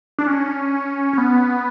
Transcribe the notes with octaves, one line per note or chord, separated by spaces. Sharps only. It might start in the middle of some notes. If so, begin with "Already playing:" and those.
D4
C#4
C#4
B3